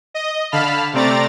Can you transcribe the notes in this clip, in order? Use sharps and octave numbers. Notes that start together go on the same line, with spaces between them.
D#5
D3 F5 A5 B5 F6
C3 A3 C4 D5 A#5 A6